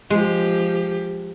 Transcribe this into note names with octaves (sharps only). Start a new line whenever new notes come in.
F3 G#3 G4